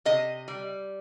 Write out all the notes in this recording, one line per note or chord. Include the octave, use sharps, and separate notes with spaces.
C3 D#5
G3